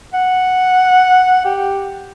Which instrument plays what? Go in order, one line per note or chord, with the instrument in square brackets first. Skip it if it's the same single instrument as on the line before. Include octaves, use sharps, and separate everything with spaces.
[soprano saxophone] F#5
G4